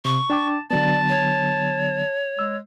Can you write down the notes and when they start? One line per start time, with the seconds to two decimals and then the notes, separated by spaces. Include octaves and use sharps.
0.05 C3 C#6
0.30 D4 G5 A5 D6
0.71 D3 F#3 B3 D5 A5
1.09 C#5
2.39 G#3 E6